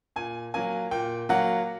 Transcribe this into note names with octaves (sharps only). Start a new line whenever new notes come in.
A#2 G#5
F#3 A#3 G#5
A#2 G5
F#3 A#3 F#5